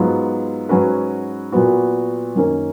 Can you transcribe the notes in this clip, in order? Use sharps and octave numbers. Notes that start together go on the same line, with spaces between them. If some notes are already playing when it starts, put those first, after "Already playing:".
Already playing: G#2 F#3 B3 F4
G#2 F#3 C#4 F#4 B4
A#2 F#3 B3 F#4
F#2 D#3 A#3 C#4